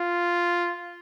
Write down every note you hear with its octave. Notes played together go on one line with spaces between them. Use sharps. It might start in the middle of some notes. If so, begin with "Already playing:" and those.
Already playing: F4